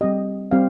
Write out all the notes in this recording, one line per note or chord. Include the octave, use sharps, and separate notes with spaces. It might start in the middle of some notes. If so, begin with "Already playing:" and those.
G3 C4 G4 D#5
G3 C4 G4 F5